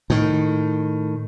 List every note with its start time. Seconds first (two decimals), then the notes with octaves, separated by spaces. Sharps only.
0.10 A2 D#3